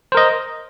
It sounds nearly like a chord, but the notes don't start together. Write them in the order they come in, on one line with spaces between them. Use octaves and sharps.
C5 A#4 D#5